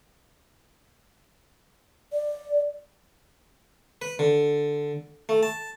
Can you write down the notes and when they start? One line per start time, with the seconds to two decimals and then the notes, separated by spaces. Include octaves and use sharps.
2.13 D5
4.02 B4
4.19 D3
5.29 A3
5.43 A5